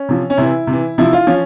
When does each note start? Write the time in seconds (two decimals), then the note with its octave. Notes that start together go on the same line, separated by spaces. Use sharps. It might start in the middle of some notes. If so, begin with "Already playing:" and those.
Already playing: C#4
0.09 C3 F3
0.30 C#4
0.37 C3 E3 E4
0.67 C3
0.72 E3
0.98 C3 F3 E4
1.13 F4
1.27 F3 C#4